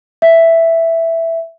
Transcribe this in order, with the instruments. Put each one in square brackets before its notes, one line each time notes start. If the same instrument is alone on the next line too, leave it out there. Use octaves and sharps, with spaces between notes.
[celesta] E5